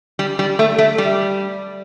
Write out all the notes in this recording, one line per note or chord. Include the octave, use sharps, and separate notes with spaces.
G3
G3
A3
A3
G3